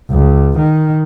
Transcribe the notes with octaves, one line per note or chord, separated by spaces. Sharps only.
C#2
D#3